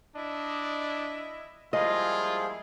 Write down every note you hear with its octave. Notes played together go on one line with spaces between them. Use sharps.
D4 E4 D#5
F3 G3 G#3 A#3 E4 F4 G#4 D#5